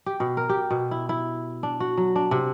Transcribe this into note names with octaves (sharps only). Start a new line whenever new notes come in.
G4
B2
A#4
G4
B2
E4
E4
D4
F#4
F#3
D4
C3